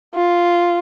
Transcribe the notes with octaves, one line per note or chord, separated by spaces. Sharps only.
F4